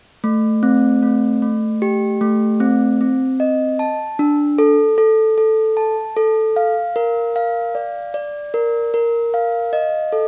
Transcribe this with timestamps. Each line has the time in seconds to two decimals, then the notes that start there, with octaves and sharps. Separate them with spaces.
0.24 A3
0.63 C4
1.02 A3
1.42 A3
1.82 G4
2.21 A3
2.60 C4
3.01 C4
3.40 D#5
3.79 A5
4.19 D4
4.58 A4
4.98 A4
5.38 A4
5.77 A5
6.17 A4
6.56 F5
6.96 A#4
7.36 F5
7.75 D5
8.14 D5
8.54 A#4
8.94 A#4
9.34 F5
9.73 D#5
10.13 A4